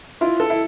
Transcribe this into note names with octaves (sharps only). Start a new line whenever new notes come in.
E4 F4
A4
E4